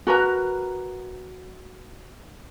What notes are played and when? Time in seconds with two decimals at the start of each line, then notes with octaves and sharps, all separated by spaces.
0.07 F#4 A#4 B4 A#5